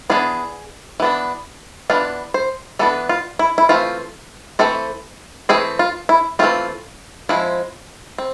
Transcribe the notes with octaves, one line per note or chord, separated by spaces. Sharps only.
E3 B3 D4 G#4
E3 B3 D4
E3 B3 D4 F4
C5
E3 B3 D4 A4
F4
E4
E4
E3 A3 C4 F4
E3 A3 C4 A4
E3 A3 C4 G#4
F4
E4
E3 A3 C4 F4
F3 G#3 C4 E4
C4